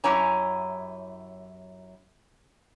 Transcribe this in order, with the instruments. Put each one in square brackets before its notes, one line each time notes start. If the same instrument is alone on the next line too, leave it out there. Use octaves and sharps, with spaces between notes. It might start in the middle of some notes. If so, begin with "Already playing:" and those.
[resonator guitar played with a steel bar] F#2 E4 G4 C#5 G#5 A#5